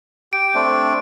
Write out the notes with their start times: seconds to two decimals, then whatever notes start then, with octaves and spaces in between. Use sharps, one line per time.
0.33 G4 D7
0.55 A3 C4 D4